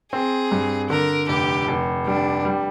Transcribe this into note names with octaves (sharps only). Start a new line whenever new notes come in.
C4 G#4
G2
D3 A#4
F1 G4
F1
G3 D4
G3